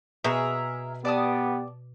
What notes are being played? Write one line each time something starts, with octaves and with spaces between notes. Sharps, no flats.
B2 G#4 A#4 E5
B3 G4 D5 A5 D#6